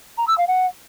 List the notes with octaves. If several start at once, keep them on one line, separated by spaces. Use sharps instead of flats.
A#5
E6
F5
F#5